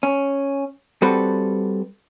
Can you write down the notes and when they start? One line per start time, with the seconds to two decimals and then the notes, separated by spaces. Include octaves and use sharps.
0.03 C#4
1.02 G3 C4 F#4 A4 B4